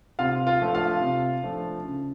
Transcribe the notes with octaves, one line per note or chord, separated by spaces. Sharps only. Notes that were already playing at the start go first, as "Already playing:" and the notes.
C3 F4 F5
F4 F5
F3 A3 D4
F4 F5
C3
F3 A3 D4
C#3